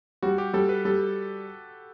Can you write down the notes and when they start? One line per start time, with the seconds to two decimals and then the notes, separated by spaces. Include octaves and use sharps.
0.22 G3 F#4
0.38 G4
0.53 G3 A4
0.69 B4
0.85 G3 A4